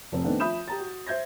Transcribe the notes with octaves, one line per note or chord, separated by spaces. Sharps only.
F1 C4
D#3 A3 B3 C4 D4
F3 E5 B5 D#6 G6 E7
G4 A#5 A6
F#4
C5 E5 G6 G#6 A#6